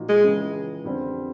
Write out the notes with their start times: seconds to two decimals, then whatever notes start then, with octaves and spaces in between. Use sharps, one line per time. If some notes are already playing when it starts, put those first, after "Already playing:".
Already playing: A#2 F3 D#4 F#4
0.09 G#3
0.24 C#2 C#3 E3
0.84 F2 D3 G3 C4